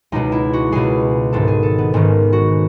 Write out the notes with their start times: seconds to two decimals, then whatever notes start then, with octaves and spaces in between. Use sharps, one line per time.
0.12 C#2 B2 G#3 D#4
0.32 E4
0.53 F#4
0.72 C#2 B2 G#3 G#4
1.33 G#1 G#2 D#3 A4
1.48 G#4
1.63 A4
1.78 B3
1.94 G#1 G#2 D#3 C#4
2.33 F#4